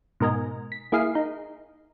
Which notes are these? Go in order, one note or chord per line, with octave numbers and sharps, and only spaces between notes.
G#2 B2 A#4 D#5 G#5
B6
A#3 E4 G#4 F5 C7
D#4